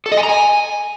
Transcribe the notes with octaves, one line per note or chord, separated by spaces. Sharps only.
A4
D#5
G#5
A#5
G#5